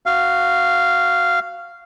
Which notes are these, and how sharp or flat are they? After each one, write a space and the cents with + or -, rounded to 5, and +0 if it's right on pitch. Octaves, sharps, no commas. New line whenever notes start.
F#4 +0 F5 -10